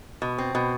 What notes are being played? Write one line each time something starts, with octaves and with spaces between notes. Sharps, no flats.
B2
C4
B2